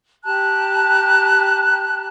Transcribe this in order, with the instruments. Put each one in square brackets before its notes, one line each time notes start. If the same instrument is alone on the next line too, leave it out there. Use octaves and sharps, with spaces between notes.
[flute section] G4 A5 A#5 F#6